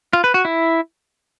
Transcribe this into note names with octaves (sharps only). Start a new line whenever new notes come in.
F4
B4
F#4
E4